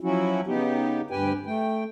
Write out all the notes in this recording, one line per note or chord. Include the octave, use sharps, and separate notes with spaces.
F3 F#3 C#4 E4 F#4
C#3 B3 D#4 G4
D2 G2 G4 B4 G5 G#5
A3 G5